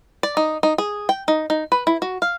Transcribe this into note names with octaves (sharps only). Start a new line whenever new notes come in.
D5
D#4
D#4
G#4
G5
D#4
D#4
B4
E4
F#4
F5